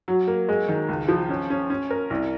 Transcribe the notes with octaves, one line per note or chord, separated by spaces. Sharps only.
F#3
A#3
G#3
D#3
C#2
F3
C#4
C#4
C#4
A#4
C2